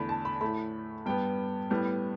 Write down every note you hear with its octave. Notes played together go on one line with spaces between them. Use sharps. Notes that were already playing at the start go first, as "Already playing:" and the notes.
Already playing: E2 D3 A3 B5
A5
B5
A2 A3 B5
G2 G3 B3 G5
A2 G3 B3